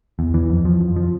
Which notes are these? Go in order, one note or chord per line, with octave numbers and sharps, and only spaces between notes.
E2
E3
F2
F3
F2
F3